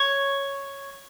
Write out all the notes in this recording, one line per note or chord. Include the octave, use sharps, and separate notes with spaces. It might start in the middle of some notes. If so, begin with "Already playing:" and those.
Already playing: C#5